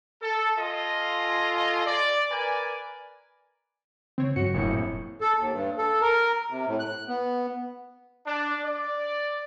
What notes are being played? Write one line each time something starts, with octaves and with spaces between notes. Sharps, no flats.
A4
F4 A4 D#5 G#5 C6
D5
A#4 B4 D5 G#5
C#3 C4 C#5
G2 F#3 F#4 C#7
E1 A#1 F2 A2
A4
D#2
G2
A4
A#4
C3
A2
F#6
B3
D4
D5